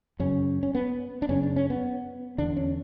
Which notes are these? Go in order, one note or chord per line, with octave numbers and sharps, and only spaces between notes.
F#2 C#3 C#4
C#4
B3
D4
F#2 C#3 C#4
D4
C#4
B3
E2 D3 D4
C#4